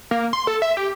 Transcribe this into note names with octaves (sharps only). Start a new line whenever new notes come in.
A#3
C6
A4
E5
G4